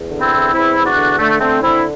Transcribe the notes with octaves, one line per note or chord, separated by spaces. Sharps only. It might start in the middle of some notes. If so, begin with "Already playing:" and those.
Already playing: E2
D3
C4 E4
E2
E2 C4 E4
E2
D4 F#4
D3
D3 A3
D3 A3 C4
D3 C4 E4